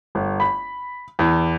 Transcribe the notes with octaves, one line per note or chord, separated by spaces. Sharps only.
G1
B5
E2